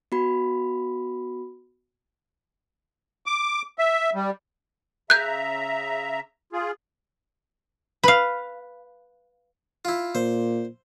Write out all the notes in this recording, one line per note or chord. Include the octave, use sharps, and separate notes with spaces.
B3 F#4 B5
D6
E5
G3
C#3 E5 A#5 F#6 G6
F4 G#4
B4 F5
E4 F4
A#2 C5